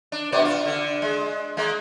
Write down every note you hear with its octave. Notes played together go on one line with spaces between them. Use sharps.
D4
B2 B3 D5
F4
D3
G#3
G#3 A#3